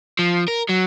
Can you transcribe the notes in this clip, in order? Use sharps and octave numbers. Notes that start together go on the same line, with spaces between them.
F3
A#4
F#3